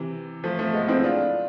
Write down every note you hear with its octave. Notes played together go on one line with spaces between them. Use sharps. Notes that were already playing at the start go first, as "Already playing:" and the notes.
Already playing: C3 E3
F3 A3
F3 A3
G#3 B3
C4 E4
D4 F4